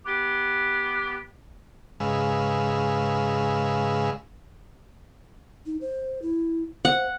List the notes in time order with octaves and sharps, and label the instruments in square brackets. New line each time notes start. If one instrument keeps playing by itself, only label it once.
[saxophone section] B3 G4
[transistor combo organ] G#2 C#3 G#3 B4 F5 E6
[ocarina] D#4
C5
E4
[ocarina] C5 [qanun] F#5